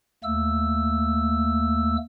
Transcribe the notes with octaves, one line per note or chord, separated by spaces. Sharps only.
D#2 A3 A#3 E6